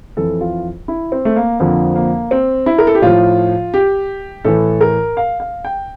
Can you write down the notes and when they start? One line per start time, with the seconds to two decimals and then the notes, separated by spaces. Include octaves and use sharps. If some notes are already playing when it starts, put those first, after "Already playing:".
0.17 F2 E3 A4
0.41 F4
0.88 E4
1.12 C4
1.25 A3
1.36 A#3
1.60 F2 D3 F3 A#3
1.95 A#3
2.31 C4
2.66 E4
2.78 A#4
2.87 A4
2.95 G4
3.02 A2 F3 F4
3.74 G4
4.45 A2 E3 A4
4.81 A#4
5.17 F5
5.40 F5
5.65 G5